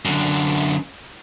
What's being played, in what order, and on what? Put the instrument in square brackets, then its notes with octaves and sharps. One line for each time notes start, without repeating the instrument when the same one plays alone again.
[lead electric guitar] F#2 D3